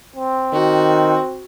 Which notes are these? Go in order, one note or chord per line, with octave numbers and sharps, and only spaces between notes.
C4
D#3 F#4